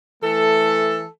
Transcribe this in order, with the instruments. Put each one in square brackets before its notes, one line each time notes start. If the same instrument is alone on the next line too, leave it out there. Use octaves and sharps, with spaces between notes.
[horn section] E3 A3 A4